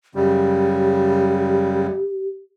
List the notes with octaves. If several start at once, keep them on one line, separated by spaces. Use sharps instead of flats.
F#2 C#3 G3 G4